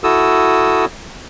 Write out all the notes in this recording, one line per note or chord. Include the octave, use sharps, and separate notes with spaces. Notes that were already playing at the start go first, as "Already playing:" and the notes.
E4 F#4 A4 D#6 E6